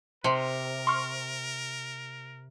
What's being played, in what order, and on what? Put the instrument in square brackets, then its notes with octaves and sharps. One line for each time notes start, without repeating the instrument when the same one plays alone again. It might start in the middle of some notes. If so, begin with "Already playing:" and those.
[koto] C3 [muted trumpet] A#4 [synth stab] C6
[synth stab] C6 C#6 F6